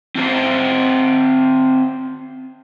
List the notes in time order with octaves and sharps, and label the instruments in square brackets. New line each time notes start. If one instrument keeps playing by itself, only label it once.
[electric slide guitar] C4 F#4 C5